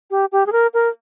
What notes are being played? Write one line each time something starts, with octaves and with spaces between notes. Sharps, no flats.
G4
G4
G#4
A#4
A#4